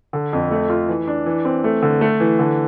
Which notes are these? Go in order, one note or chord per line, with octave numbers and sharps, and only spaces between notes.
D3
F2
A3
F4
E3
D4
E3
C4
A3
D3
A3
E3
D3